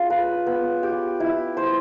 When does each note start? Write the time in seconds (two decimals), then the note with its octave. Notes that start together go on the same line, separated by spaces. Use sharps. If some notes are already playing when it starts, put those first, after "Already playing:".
Already playing: C#4 F4 G#4
0.10 B4
0.46 B3
0.83 G4
1.20 E4
1.57 C5